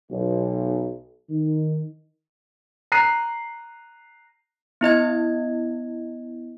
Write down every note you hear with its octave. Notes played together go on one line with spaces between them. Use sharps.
B1
D#3
A#5 F#6 C7 D#7
B3 E4 D#5 G#6